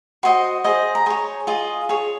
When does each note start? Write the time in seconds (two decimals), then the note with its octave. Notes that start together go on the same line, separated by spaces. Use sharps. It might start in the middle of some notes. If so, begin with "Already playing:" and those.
0.23 F#4 C5 D#5 C6
0.64 G#4 C5 D#5
0.95 A#5
1.06 G#4 C6
1.10 C#5
1.47 F4 G#4 D#5
1.89 G#4 C#5